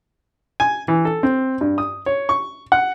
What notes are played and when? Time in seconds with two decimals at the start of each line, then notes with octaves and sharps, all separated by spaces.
0.60 G#5
0.88 E3
1.05 A4
1.23 C4
1.61 G2
1.78 D#6
2.06 C#5
2.29 C#6
2.72 F#5